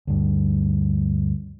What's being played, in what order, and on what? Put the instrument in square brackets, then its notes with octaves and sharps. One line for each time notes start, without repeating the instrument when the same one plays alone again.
[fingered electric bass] D2 G2